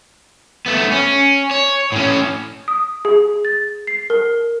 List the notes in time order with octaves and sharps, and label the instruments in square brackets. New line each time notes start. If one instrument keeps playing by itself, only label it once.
[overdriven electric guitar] A3 B3
C#4
C#5
A2 C#4
[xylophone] D#6
G#4
A6
C7
A#4